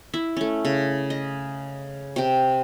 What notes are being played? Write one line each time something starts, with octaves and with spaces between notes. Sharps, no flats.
E4 E5
A3 C#4
C#3
D#5
C3 G5